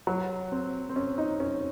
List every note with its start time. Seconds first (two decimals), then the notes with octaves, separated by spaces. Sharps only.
0.07 F#3
0.52 C4
0.89 C4
0.96 C#4
1.18 D#4
1.40 C#4